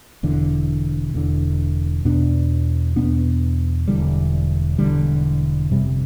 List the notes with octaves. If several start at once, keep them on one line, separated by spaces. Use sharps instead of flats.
E1 E2 D3
E1 E2 D3
E2 B2 B3 D4
E2 B2 B3 D4
E1 E2 D3 G3
E1 E2 D3 G3
G1 F2 C3 G3